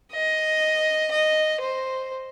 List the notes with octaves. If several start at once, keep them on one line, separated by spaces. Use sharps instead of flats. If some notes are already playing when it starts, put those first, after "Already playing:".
D#5
D#5
C5